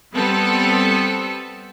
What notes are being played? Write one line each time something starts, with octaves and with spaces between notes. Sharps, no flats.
G3 B3 C4 A4